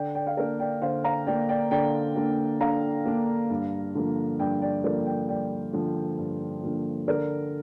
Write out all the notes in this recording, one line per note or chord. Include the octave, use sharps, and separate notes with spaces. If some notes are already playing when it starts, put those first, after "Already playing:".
Already playing: D3 D5 G5
D5 G5
F5
A#3 D4 A#4 D5
D5 G5
D3 C5 F5
F5 A#5
A#3 D4 D5 G5
D5 G5
D3 D5 G5
A#3 D4
D3 F5 A#5
A#3 D4
G2
D3 F3 A#3
G2 D5 G5
D5 G5
D3 F3 A#3 A#4 D5
D5 G5
G2 D5 G5
D3 F3 A#3
G2
D3 F3 A#3
D3 A#4 D5